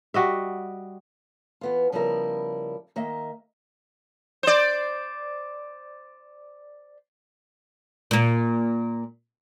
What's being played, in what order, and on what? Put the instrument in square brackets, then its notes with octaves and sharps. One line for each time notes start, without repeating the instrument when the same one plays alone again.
[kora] G3 F#4 D#5 E5
[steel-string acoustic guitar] E3 B3 F4
C#3 F3 G3 B3 E4 A#4
D#3 A#3 D#5 E5
[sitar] C5 D5
[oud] A#2 A#3